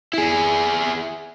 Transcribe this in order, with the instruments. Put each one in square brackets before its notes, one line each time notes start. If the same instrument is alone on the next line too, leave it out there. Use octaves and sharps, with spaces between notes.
[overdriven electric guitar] E4 G#4